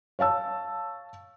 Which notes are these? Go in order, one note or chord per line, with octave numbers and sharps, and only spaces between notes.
C#5 F5 A5 E6